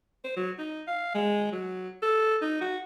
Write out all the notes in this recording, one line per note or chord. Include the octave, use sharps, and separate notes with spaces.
C5
F#3
D#4
F5
G#3
F#3
A4
D#4
F#4